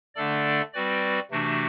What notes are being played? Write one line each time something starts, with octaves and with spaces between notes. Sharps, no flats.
D3 A3 D4 A4 D5
G3 C4 F#4 B4 D5
C3 E3 A3 D4 F#4